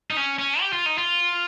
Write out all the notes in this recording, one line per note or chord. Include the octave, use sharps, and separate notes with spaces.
D#4
C#4
C#4
G4
F4
D#4
F4